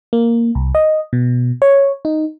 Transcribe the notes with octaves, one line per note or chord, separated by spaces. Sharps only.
A#3
C2
D#5
B2
C#5
D#4